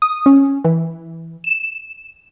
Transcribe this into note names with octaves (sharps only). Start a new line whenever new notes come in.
D#6
C#4
E3
E7